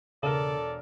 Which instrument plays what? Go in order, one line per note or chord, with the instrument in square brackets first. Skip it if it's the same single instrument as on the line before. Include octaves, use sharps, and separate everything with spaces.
[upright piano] E1 D4 A#4 [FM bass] C#3 [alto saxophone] A4 [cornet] D5